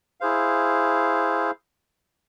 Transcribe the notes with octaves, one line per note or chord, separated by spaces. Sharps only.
E4 G#4 C5 F5